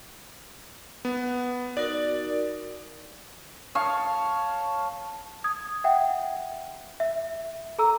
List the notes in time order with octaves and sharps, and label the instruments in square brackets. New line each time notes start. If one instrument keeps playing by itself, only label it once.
[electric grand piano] B3
[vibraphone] D#4 F#4 A#4 [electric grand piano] D5
[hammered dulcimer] C#5 F5 A5
[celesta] D#6 G#6
E5 F#5 G5
E5
A4 A#5 E6